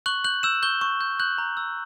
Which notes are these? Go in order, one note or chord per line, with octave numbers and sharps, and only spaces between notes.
C#6 F#6 F#7
F#6 G6 F#7
E6 G6 E7
C#6 G6 G7
C#6
G6
F#6 G6 F#7
A#5
E6